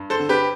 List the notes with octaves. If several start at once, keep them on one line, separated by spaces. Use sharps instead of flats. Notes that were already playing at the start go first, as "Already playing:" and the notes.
Already playing: G2
A4 C5
D3
G4 B4